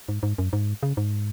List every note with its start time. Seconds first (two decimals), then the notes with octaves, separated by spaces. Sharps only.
0.09 G#2
0.23 G#2
0.38 F#2
0.53 G#2
0.83 C#3
0.97 G#2